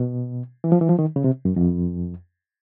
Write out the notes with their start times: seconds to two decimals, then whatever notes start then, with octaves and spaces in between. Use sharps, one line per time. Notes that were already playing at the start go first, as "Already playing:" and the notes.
Already playing: B2
0.64 E3
0.72 F3
0.81 E3
0.89 F3
0.99 D#3
1.16 C#3
1.24 C3
1.45 F#2
1.56 F2